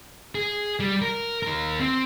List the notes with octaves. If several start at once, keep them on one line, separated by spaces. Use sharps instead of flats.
G#4
G3
A#4
D#2 A#4
C4